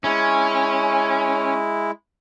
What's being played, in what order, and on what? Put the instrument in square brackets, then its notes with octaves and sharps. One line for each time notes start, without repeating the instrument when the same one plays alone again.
[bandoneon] G#3 E4 [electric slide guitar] C#4